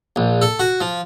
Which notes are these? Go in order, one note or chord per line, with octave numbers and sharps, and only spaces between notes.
A#1
A4
F#4
F3